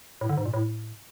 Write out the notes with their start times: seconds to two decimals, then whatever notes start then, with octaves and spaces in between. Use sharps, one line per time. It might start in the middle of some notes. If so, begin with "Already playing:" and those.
0.21 A2
0.29 D3
0.37 G#2
0.45 A#2
0.54 A2